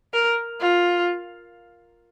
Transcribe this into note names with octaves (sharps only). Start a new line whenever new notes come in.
A#4
F4